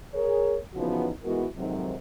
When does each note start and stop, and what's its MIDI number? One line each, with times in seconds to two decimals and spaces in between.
0.14 0.57 68
0.14 0.57 70
0.14 0.57 73
0.74 1.09 49
0.74 1.09 52
0.74 1.09 53
0.74 1.09 59
0.74 1.09 63
0.74 1.09 66
1.24 1.45 52
1.24 1.45 56
1.24 1.45 59
1.24 1.45 64
1.24 1.45 66
1.24 1.45 70
1.57 1.94 41
1.57 1.94 44
1.57 1.94 48
1.57 1.94 51
1.57 1.94 54